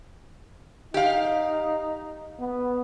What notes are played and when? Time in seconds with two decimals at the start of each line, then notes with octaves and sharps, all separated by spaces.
0.94 D#4 G4 F5
2.40 B3